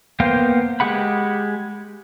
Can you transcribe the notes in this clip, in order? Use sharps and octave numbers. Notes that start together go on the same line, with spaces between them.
A#3 B3 C5 F5 G5
G#3 G4 G#4 F#5 B5